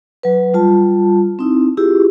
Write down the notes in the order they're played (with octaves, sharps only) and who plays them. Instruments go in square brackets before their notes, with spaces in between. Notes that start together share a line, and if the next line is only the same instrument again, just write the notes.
[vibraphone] F#3 B4
G3 F4 A5
C4 D#4 E4
E4 F4 G4 G#4